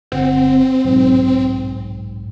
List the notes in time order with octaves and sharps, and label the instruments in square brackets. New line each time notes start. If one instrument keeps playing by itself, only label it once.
[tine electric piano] G1 F#5 [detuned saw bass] C4
[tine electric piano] B1 G#2